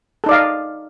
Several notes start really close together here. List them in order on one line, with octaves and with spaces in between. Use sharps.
A4 D#4 D5 F5 D#5